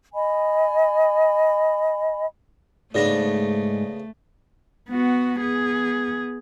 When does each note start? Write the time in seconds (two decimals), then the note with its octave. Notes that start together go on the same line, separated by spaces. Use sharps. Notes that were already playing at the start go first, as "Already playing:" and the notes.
0.13 D#5 G#5 B5
2.95 G#2 C#3 A3 B3 D4 D5 A#6
4.89 B3 F#4
5.39 B3 G#4